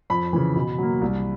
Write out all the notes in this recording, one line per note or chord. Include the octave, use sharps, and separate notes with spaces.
F2 B5
C#3 E3
B2
F#3 A#3
C2